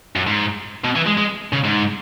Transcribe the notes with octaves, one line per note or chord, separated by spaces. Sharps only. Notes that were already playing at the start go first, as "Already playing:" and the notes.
F#2
G#2
B2
E3
G#3
G#3
C#3
G#2